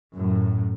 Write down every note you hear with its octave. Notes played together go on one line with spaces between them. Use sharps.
F#2 A2